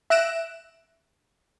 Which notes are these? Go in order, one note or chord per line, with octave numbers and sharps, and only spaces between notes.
E5 F#6 A#6 D7 E7